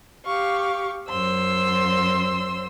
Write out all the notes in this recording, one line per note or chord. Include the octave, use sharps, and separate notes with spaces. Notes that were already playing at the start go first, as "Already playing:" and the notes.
G4 F5 C#6
F#2 C5 C6 E6